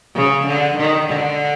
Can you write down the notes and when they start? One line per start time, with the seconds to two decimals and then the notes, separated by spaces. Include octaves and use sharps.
0.15 C#3
0.46 D3
0.77 D#3
1.06 D3